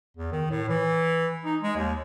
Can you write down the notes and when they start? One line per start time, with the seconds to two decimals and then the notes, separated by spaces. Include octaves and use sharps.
0.17 E2
0.32 D#3
0.50 A2
0.69 E3
1.45 D#4
1.62 G#3
1.76 D#2